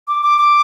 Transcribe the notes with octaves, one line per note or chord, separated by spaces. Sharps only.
D6
D6
D6